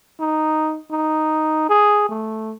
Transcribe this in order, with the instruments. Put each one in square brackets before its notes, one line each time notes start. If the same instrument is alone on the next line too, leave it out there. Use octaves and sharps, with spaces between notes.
[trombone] D#4
D#4
G#4
A3